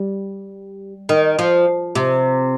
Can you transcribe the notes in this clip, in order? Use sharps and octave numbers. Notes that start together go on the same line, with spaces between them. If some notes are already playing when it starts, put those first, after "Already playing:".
Already playing: G3
D#3
F3
C3